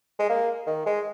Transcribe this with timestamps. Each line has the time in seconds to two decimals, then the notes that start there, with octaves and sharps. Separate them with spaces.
0.19 G#3
0.29 A#3
0.67 D#3
0.86 G#3